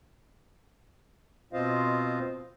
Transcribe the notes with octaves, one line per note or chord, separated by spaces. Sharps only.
B2 C4 F4 C5 D#5 F5